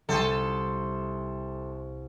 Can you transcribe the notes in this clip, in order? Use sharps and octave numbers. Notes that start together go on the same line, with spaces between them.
C2 A4 C5 G#5